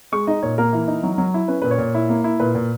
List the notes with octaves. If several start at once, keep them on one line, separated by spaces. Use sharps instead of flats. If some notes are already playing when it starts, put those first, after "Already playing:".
G#3 C#6
D#4 D#5
A#2 C#5
A#3 A#4
E3
D#4
F#3
F#3
E4
C#4 B4
A#2 B4
C#5
A#2
E4
A#3
E4
A#2 B4
A#2